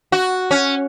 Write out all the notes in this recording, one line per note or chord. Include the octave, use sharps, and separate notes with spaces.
F#4
C#4